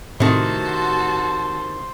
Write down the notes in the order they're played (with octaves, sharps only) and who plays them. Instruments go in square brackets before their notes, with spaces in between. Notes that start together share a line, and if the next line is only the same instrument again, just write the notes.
[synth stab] A2 [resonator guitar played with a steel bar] C3 D#3 [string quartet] F#4 A5 [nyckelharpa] C5 C6